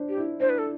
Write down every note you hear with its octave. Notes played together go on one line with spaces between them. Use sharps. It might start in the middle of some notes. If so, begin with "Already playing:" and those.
Already playing: D4 C5
G4
E4
D4 C5
B4
A4